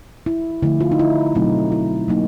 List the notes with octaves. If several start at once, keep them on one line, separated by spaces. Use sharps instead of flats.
E4
D3 F3 A3 E4
F4
D#4
E4
B2 F#3 A3 C4 D#4
E4
F#3 A#3 D#4